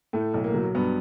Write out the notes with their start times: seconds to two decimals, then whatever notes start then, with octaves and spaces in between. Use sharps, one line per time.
0.13 A2 A3
0.34 B1
0.44 A#3
0.54 F#3
0.75 G2 B3